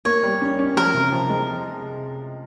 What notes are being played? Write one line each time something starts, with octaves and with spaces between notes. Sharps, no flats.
A#3 C#5
G3
C#4
C#4
F3 A#4
C3
F3
G#3